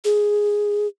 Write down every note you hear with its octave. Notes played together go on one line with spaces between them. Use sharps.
G#4